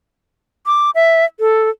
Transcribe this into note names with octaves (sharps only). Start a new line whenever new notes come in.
D6
E5
A4